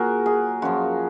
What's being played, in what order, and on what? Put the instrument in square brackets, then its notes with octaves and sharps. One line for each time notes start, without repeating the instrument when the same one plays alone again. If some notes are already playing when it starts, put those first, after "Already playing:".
Already playing: [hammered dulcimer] A#2 F#3 F#4 G#4 A#4
G#4
F#2 F3 F#4